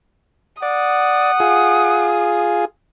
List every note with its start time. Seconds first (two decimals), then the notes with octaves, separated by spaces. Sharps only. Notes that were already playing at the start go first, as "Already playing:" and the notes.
0.62 D5 F#5 D#6
1.40 F4 G#4